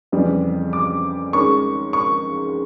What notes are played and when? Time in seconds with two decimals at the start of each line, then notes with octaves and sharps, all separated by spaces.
0.12 F2 C#3 E3 G3
0.73 D6
1.33 D#3 G#3 C#4 C#6
1.93 C#6